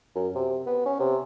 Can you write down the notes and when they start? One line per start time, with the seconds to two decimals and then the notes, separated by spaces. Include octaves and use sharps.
0.16 F#2
0.35 C3
0.67 B3
0.86 C#4
0.99 C3